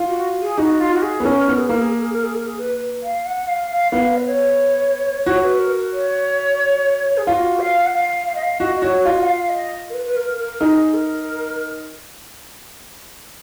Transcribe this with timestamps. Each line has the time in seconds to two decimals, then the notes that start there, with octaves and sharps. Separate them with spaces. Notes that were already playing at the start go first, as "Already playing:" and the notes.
Already playing: F4
0.08 F#4
0.41 G#4
0.58 D#4 F#4
0.80 F4
0.94 F#4
1.02 G#4
1.20 B3
1.25 C#4 A#4
1.48 B3
1.58 G#4
1.69 A#3 A#4
1.80 G#4
1.91 A#4
2.03 G#4
2.13 A#4
2.24 G#4
2.35 A#4
2.47 G#4
2.59 B4
3.03 F5
3.26 F#5
3.48 F5
3.70 F5
3.92 B3 F5
4.18 B4
4.26 C#5
5.26 F#4 C#5
5.43 B4
5.59 A#4
5.93 C#5
7.17 G#4
7.26 F4 F#4
7.60 F5
7.86 F#5
7.93 F5
8.27 F5
8.35 D#5
8.43 F5
8.60 F#4 D#5
8.75 D#5
8.82 F#4 C#5
9.05 F4 D#5
9.22 F#5
9.27 F5
9.49 D#5
9.90 A#4
9.94 B4
10.06 B4
10.16 A#4
10.38 A#4
10.61 D#4 G#4
10.94 A#4